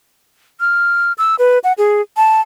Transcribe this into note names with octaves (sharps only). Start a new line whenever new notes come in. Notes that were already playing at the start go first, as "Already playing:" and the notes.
F6
E6
B4
F#5
G#4
A5